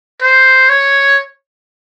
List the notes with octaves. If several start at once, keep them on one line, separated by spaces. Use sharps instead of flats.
C5
C#5